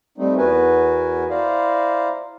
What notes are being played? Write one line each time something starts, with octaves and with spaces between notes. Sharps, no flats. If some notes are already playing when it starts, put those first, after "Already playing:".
G3 A3 C4 D#4
E2 B3 F#4 A#4 B4 G#5
E4 C5 D5 F5 A#5